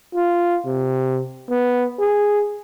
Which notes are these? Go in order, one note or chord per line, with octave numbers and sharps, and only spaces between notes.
F4
C3
B3
G#4